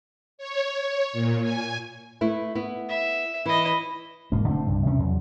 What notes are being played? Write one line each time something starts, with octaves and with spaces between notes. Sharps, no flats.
C#5
C#5
A#2
G#5
A3 E4 B4
B3 E4
E5
E3 E4 D#5
E1 G#2 A#3
D3 A3 A#3 C4
C2 G2
D#2 C3 C#4
E2 F#3